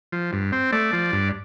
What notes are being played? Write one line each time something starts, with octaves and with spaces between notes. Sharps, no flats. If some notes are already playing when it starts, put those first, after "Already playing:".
F3
G2
C4
A3 D5
F3
G2